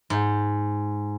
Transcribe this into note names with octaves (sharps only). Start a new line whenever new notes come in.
G#2